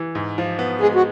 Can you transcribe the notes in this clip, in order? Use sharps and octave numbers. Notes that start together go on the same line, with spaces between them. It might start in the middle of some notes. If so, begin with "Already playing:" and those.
Already playing: E3
G#2
F3
B3
G#3 G#4
F#4